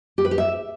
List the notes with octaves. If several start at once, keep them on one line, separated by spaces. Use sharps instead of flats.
G4
B4
G4
E5